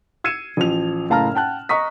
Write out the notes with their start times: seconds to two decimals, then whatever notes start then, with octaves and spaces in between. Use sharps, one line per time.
0.24 E6 G#6 C7 C#7 D#7 E7
0.57 A1 F3 F7
1.10 F#1 A2 F5 A5 A#5 F6
1.35 F#5 G5 A5 F#6
1.69 D#5 A#5 C#6 D#6 B6